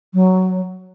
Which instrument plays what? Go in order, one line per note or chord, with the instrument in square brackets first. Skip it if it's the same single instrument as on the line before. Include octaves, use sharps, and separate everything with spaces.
[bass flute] F#3